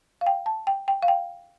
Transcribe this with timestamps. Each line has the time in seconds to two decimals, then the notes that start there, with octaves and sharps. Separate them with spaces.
0.21 F5
0.27 G5
0.46 A5
0.67 G5
0.88 G5
1.03 F5
1.08 G5